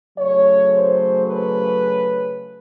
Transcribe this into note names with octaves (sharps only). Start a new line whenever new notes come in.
C#3 F#3 A3 C#5
C5
B4